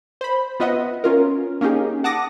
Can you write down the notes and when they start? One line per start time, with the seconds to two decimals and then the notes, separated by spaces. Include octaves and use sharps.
0.21 C5 B5
0.60 B3 F4 B4 D#5 E5 F#5
1.04 C#4 F4 A#4
1.61 A#3 C#4 D#4 G4 G#4
2.04 F#5 A5 D6 D#6 A#6